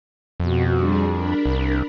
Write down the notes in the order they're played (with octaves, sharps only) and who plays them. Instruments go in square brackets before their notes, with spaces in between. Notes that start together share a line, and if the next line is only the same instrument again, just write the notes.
[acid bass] F2 [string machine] B2 F#4
[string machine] G3 D4 G#4
D4 A#4 B5
[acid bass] C2